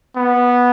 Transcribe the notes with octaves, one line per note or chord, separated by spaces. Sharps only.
B3